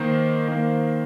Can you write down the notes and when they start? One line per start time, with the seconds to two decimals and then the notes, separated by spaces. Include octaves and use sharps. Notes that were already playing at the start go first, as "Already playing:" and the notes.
Already playing: D#3 A#3 C5
0.48 D#3 A#3